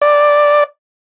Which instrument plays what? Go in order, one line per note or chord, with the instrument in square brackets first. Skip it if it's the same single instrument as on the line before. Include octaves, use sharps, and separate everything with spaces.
[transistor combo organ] D5